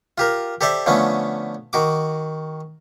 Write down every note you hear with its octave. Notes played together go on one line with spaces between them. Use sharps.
F4 G4 A#4
G4 A4 C5 D5 E5
D3 F3 A3 B3 C#4
D#3 F#4 D6